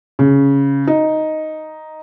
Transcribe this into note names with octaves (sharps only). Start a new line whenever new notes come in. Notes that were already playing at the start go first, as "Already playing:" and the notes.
C#3
D#4